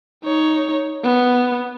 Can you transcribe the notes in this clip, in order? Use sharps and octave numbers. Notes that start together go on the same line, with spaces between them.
D#4 C#5
B3